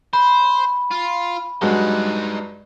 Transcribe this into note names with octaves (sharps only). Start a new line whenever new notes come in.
C5 B5
F4
G2 F#3 G#3 D#4 F#5